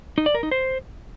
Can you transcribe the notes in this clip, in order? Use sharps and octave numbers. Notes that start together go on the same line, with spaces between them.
D#4
D5
A#4
D#4
C5